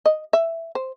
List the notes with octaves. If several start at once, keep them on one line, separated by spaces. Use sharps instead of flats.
D#5
E5
C5